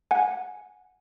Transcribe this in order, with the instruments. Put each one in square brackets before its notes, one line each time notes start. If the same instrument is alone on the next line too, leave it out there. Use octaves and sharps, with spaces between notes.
[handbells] F#5 G#5